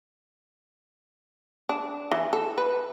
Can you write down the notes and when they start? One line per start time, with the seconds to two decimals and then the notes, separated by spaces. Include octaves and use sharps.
1.69 D4
2.11 E3
2.33 A4
2.58 B4